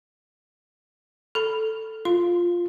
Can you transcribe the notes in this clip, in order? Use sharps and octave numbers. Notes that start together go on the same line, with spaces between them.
A4 B5
F4 C6